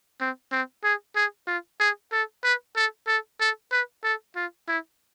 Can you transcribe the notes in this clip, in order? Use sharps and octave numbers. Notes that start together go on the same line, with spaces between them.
C4
C4
G#4
G#4
F4
G#4
A4
B4
A4
A4
A4
B4
A4
F4
E4